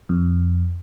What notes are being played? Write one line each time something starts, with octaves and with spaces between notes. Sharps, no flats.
F2